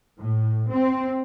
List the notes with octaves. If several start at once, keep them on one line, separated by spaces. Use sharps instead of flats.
A2
C4